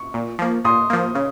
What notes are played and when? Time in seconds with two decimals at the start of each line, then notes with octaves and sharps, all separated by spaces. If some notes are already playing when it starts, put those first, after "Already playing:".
Already playing: C#6
0.14 A#2
0.39 F3 A#3
0.65 A#2 C6 D#6
0.90 F3 A#3
1.15 C#3